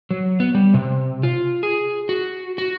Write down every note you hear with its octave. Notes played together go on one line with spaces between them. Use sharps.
F#3
B3
G3
C3
F4
G#4
F#4
F#4